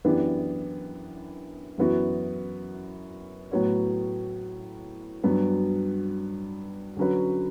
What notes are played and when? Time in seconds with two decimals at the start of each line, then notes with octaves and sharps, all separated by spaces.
0.04 F#2 E3 B3 D4 G4
1.78 F#2 E3 B3 F#4
3.51 A2 F#3 B3 F#4 C#5
5.24 G2 F#3 B3
6.97 D3 F#3 C#4 F#4 B4